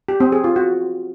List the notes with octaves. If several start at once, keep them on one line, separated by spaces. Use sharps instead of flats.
G4
C4
G#4
F4
F#4